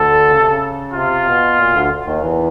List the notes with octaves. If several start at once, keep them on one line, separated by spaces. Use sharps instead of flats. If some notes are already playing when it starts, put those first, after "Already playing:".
Already playing: D2 D3 A4
C#3
C3
C#3
C3 F4
B2
A#2
D2 D3
D#2 D#3
E2 E3